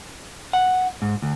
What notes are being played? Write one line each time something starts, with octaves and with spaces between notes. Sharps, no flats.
F#5
G#2
D2